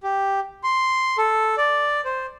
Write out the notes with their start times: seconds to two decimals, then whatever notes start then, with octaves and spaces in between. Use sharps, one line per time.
0.03 G4
0.64 C6
1.18 A4
1.57 D5
2.05 C5